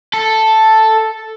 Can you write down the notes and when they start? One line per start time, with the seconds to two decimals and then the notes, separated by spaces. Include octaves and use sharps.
0.13 A4